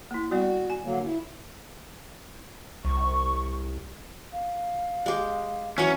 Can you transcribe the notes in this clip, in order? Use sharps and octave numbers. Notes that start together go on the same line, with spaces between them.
A#3 E4
G3 B3 F#4 D5
G#5
D3 F#3 A#3
E4
C2 C#6
F5
G#3 G4
E3 F#3 C#4 C#5